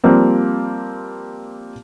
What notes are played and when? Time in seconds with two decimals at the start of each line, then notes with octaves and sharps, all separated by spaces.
0.04 F3 G3 A#3 C4